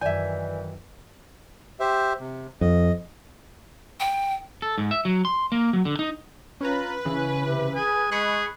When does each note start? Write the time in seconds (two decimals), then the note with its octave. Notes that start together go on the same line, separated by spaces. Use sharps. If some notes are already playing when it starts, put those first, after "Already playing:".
0.01 F#2 D#3 E3 D5 E5 G#5 G6
1.80 G4 C5 E5
2.20 C3
2.61 F2 D#5
4.00 G5
4.62 A4
4.78 G#2
4.91 E5
5.05 F#3
5.25 C6
5.52 A#3
5.73 F#3
5.85 D3
5.99 D#4
6.61 C#4 F4 B4 A#5
7.05 C#3 E3 C#4
7.46 C3
7.76 G#4 G#5
8.12 G#3 G#4 B5 C#6 F#6